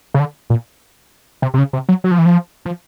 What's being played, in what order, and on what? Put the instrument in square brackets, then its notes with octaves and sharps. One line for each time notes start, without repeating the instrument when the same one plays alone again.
[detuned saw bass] C#3
D3
A#2
C3
C3
C#3
C3
F#3
F#3
F3
E3
F3
F3